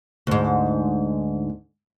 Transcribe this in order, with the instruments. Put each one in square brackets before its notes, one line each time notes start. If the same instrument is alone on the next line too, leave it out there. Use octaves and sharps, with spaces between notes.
[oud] D2 G#2